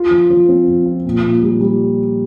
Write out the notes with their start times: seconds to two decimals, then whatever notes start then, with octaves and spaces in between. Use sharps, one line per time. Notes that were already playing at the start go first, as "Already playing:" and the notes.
Already playing: F4
0.11 F3
0.30 F3
0.48 C4
0.68 F3
0.86 F4
1.06 A#2
1.23 A#2
1.42 G3
1.61 G3